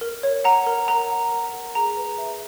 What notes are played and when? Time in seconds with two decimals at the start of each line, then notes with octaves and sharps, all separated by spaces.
0.01 A#4
0.23 C#5
0.44 F#5 A#5
0.67 A#4
0.88 A#4 A#5
1.10 F#5
1.32 A#4
1.54 A#4
1.75 G#4 A#5
1.97 B4
2.18 E5